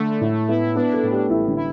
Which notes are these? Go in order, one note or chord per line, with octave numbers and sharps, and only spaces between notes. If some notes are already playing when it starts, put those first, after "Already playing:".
Already playing: D3 A3 A4
A2 E4
B3 E4
B3 D4
A4
A2
G4
A1 E4
D3
E4